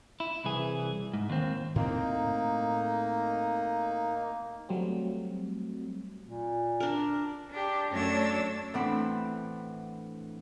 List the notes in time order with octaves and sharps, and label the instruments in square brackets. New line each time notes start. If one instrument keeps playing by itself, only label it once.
[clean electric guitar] E4
C2 E3 G#4
G#2
D#2 C4
[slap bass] A2 C4 [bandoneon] A#3 [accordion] D#4
[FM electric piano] F#3 G3 A3 C4
[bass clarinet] A#2
[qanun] D4 A#4
[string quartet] D4 G4
F#2 A3 D4 C#5 E6 A6
[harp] A2 E3 C4 D4 F#5 B5